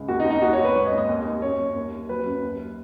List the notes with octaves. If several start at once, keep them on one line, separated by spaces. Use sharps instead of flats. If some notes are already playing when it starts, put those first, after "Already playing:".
Already playing: C#2
D#2 F#4
D#4
D#2
D#4
D#2 F#4
C#5
D#2
B4
G#2 C#5
D#5
G#2
D#5
D#2
D#2
F#2 C#5
F#2
D#2
D#2
F#3 B4
F#2
D#2